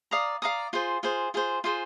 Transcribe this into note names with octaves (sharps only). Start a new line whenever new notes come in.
D5 F5 A#5 D#6
D5 F5 A#5 D#6
F4 G#4 C5
F4 G#4 C5
F4 G#4 C5
F4 G#4 C5